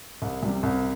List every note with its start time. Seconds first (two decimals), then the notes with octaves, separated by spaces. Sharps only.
0.22 C2
0.42 C3 G3
0.63 C2